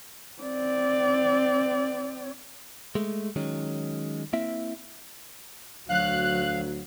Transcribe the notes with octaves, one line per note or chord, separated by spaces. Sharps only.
C4 D5
G#3 A3
D#3 F#3 G#3 C#4
A#3 C4 E4 E5
D2 F#3 F5 F#6